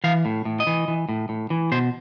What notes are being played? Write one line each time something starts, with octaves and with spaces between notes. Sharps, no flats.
E3 F5
A2
A2
D#5
E3
E3
A2
A2
E3
B2 C5